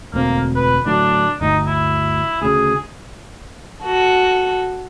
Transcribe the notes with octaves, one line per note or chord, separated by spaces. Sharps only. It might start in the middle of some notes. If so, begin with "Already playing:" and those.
E1 D2 A#3 C4
B4
A2 D3 F#3 D4
G1 D2 D#4
E4
D2 C#3 G#4
F#4 A4